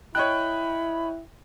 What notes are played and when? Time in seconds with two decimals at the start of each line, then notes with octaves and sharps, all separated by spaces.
0.15 E4 C#5 D#5 G5 B5 F#6